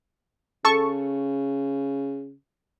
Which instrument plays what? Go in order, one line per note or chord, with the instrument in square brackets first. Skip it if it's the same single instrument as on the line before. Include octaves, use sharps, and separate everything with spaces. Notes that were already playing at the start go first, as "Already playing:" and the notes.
[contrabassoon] C#3 [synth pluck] A4 A5 C#6